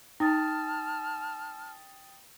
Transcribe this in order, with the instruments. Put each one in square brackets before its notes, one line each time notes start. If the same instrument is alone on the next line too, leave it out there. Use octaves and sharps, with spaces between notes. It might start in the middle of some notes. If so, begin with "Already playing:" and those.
[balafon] D#4 [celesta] G5 D#6 A6 [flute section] A5 F6